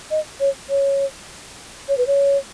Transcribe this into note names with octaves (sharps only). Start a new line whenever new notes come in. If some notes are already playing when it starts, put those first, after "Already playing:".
D#5
C#5
C#5
C#5
B4
C#5